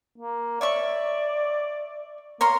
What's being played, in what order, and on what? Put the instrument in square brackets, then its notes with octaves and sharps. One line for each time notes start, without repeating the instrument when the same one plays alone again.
[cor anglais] A#3
[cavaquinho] C#5 E5 C#6 [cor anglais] D5
[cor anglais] A#3 [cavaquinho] A#4 C#5 C6